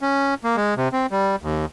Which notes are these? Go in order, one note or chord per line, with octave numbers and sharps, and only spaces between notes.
C#4
A#3
G#3
C3
C4
G3
D#2